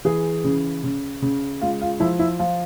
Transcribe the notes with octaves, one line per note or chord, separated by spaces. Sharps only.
E3 G#4
C#3
C#3
C#3
G#3 F4
F4
F3 E4
E4
F3 F4